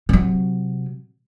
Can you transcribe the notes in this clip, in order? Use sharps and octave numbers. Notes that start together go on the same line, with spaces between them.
C3 F#3